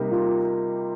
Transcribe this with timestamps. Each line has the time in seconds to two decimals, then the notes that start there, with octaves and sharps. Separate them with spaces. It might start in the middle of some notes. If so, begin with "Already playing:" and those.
Already playing: C3 G3 A#3 D#4 G4
0.12 F4